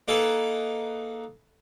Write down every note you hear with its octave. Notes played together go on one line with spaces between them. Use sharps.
A#3 D#4 G#4 A4 B4